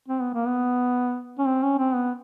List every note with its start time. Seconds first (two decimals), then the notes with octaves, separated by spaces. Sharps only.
0.08 C4
0.21 B3
0.34 A#3
0.47 B3
1.38 C#4
1.47 C4
1.63 C#4
1.78 C4
1.94 B3